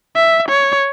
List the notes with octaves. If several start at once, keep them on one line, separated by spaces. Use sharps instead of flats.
E5
C#5